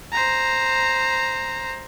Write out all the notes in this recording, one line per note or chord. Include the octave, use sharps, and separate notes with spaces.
C5 A#5